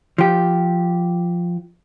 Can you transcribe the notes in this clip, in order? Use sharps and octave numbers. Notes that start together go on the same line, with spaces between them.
F3 G4